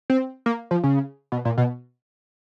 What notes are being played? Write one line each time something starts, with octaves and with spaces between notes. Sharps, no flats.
C4
A#3
F3
C#3
B2
A#2
B2